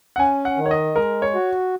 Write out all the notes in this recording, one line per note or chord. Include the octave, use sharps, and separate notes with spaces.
F#5
C#4 G#5
F#5
D#3
C#5
D#5
G#3 A#4
C#5
F#4